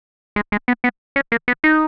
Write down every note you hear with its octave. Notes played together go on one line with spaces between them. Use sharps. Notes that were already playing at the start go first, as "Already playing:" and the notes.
G#3
G#3
B3
B3
C#4
A#3
B3
D#4